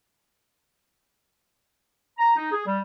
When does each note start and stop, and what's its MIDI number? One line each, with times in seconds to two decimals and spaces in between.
2.18 2.36 82
2.37 2.49 63
2.51 2.63 68
2.66 2.80 55